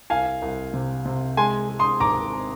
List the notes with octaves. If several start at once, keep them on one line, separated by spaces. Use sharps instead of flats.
C2 F5 G#5
C2
C3
C3
G#3 G#5 C6
G#3
C6 D#6
G#1 A#5 D6